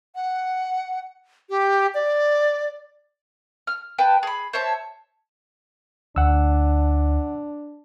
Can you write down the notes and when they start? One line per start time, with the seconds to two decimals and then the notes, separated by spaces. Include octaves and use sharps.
0.15 F#5
1.49 G4
1.94 D5
3.67 F6
3.98 B4 G5 A5
4.23 G#4 B5
4.53 C5 C#5 E5 A5
6.16 D2 D4 F#5 E6